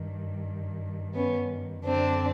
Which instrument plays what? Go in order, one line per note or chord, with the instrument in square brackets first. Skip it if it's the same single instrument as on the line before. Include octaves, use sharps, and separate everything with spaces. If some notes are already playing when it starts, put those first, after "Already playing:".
Already playing: [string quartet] G2 D#3
B3 C#4
F#2 D3 C4 D4